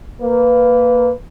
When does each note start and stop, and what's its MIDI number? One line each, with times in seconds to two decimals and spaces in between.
0.21 1.12 58
0.21 1.12 71